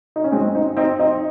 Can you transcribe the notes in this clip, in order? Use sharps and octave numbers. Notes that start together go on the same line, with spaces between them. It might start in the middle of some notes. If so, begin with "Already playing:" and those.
D#4
C#4
G#3 C4
C4 D#4
C4 D#4
C4 D#4